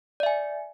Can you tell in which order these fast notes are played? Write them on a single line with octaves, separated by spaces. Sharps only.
D5 E5 G#5